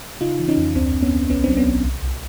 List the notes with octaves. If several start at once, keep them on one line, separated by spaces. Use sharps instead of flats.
C#3 D#4 F4
E3
C#4 D#4
F2
D2 C4 D4
D2
B3 C#4
D2
B1 B3 C#4
F#3 C4 D4
B3 C#4
B1
C2
C2